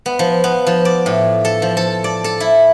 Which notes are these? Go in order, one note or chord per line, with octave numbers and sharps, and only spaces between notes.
B3
F3
B3
F3
D5
A2
A4
F3
A4
D5
A4
E4